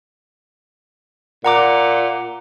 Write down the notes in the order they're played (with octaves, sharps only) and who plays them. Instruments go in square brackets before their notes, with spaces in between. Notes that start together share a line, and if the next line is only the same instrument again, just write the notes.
[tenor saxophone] A#2 [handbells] F#5 A#5 D6